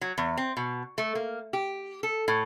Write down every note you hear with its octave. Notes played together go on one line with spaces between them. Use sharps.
F#3
E2
C4
B2
A3
A#3
G4
A4
A2